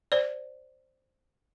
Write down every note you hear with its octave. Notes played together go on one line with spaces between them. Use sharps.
C5 D5